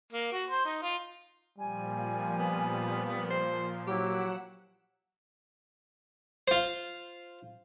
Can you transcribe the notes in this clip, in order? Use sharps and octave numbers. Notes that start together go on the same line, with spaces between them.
A#3
F#4
C5
D#4
F4
A#2 F3 G3 G#5
B3
C5
F#3 E4 G4 F#5 E7
F4 C5